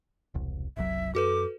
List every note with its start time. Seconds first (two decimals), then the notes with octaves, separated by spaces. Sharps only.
0.34 E1 C2
0.77 F#1 C2 F#3 E5
1.15 F#2 F#4 A4 B4 D6